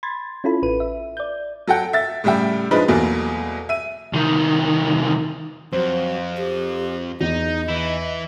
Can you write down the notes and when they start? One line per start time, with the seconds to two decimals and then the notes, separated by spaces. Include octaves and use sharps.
0.03 B5 C6 G#6 A6
0.44 C#4 E4 F4 A4 B5
0.63 A1 B4 D#7
0.80 E5
1.17 D5 G6
1.67 F#3 A4 F#5 G5
1.93 E5 A6
2.24 A2 C#3 G3 E5 G5
2.71 F3 G#3 D4 D#4 B4
2.88 E2 B2 F#3 A3 A#3
3.69 E5 D#7
4.13 C2 D#3
5.72 F2 F#3 C5
6.38 G4
7.21 E2 D#4 D#5
7.69 E3 E4